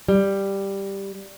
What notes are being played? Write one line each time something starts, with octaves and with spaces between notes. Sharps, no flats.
G3